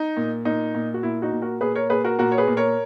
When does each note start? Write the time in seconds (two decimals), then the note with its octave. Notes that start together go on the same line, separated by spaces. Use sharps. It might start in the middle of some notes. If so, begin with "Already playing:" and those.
Already playing: D#4
0.17 A#2
0.45 A#2 D#4
0.75 A#2
0.94 F#4
1.03 A#2 E4
1.22 D#4 F#4
1.32 A#2
1.42 F#4 A#4
1.61 A#2 G#4 B4
1.75 A#4 C#5
1.90 A#2 G#4 B4
2.04 F#4 A#4
2.19 A#2 F#4 A#4
2.32 C#5
2.38 G#4 B4
2.48 A#2
2.57 A#4 C#5